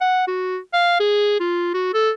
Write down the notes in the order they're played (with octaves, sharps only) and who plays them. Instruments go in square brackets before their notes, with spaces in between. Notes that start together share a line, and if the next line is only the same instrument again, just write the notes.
[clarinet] F#5
F#4
F5
G#4
F4
F#4
A4